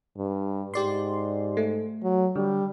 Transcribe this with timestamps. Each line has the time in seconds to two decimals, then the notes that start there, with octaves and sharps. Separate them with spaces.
0.17 G2
0.74 G#2 G4 D5 C6
1.57 A3
2.03 F#3
2.36 D3 G3